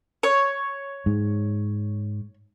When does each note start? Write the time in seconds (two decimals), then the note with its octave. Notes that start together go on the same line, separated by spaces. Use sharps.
0.23 C#5
1.06 G#2